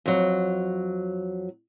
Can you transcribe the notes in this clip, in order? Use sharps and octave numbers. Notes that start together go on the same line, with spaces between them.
F2 F#3